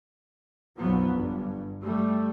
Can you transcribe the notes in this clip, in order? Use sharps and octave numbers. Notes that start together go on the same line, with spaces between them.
B1 F2 F3 F#3 B3
G1 G2
G3 A3